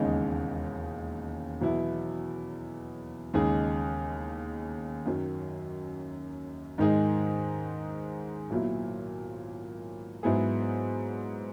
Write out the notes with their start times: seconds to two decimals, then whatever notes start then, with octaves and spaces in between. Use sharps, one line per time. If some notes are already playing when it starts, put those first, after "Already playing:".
Already playing: E1 D#2 C#3 G#3 D#4
1.61 E2 B2 F#3 B3 E4
3.34 D#2 C#3 G#3 D#4 G#4
5.06 F#2 D#3 F#3
6.78 G#2 D#3 G#3 D#4 G#4
8.50 B1 A#2 F#3 A#3 E4
10.23 G#2 F#3 B3 E4 G#4